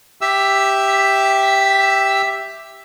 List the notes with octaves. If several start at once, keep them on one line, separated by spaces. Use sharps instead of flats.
G4 E5 E6